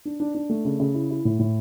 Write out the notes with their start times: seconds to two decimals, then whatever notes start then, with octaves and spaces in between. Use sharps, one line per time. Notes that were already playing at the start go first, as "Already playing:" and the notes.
0.05 D4
0.20 D4
0.35 D4
0.49 A3
0.65 C#3
0.80 C#3
0.94 E4
1.10 E4
1.25 A2
1.39 A2